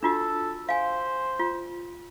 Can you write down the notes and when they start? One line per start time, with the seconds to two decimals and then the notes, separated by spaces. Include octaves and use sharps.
0.03 D4 F4 F#4 A4
0.69 C5 F5 G#5
1.39 F4